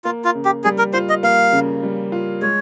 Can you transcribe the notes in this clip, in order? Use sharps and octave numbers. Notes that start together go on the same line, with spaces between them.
A#3 F4
F4
C#3
G4
G3 G#4
A#4
F4 C5
D#5
A#3 F5
C#3
G3
F4
G#3 C#5